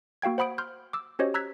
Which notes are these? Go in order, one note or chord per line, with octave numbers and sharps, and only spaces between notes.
A#3 F#4 F5 G5 G#6
C5 F#5 B5 D#6 D7
C6 F6 G6
D6 E6
C#4 F#4 G4 C5 C#5 D#5
A#5 E6 F#6 G#6 B6